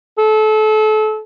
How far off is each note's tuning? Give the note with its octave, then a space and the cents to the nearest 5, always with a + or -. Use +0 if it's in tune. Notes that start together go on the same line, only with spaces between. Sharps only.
A4 -30